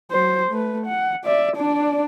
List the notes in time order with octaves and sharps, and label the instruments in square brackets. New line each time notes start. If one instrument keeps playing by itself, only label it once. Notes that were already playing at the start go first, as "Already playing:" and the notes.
[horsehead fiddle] F#3 C5
A3 B4
F#5
D5 E5
D4 D5